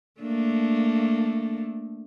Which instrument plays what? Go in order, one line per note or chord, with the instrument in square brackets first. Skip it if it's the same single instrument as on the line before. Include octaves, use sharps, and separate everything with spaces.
[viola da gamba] A3 A#3 D4